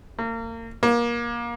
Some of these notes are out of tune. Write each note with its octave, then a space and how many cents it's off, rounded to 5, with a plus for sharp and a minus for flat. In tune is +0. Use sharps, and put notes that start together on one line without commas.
A#3 -35
A#3 +25